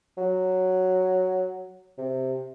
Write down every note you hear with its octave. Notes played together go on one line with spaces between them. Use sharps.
F#3
C3